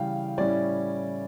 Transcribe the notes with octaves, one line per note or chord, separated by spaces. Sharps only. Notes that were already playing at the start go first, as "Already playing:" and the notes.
Already playing: C#3 E3 G3 F5 G5
A2 G3 C#4 E4 D5